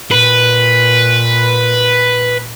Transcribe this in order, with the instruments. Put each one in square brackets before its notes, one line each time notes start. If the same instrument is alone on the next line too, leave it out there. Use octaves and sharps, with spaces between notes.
[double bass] A#2 [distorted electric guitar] B4